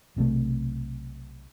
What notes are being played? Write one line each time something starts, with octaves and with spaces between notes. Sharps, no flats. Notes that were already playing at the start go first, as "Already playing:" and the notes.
B1 C3 E3 A3